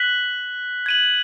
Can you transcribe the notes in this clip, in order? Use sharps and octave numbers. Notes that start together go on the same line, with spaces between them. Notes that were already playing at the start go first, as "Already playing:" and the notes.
Already playing: F#6 B6 F#7
G#6 D#7 F#7